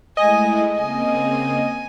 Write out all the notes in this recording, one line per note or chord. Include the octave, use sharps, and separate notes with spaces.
G#3 A3 E4 D#5 G#5
C#3 A#3 C4 G#5